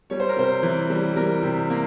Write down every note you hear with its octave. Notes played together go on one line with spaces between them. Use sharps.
G3 C#5
C5
A#4
C3 C5
E3
G3
G3 A#4
C3
A#3